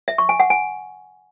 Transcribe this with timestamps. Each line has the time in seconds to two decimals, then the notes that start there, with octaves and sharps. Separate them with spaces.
0.08 E5
0.18 C#6
0.29 G#5
0.40 F#5
0.50 G#5